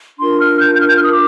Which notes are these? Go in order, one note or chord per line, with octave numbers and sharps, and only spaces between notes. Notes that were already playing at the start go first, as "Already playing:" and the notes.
D4 F4 A#4 C6
F6
G6
G6
F6
G6
F6
D#6
D6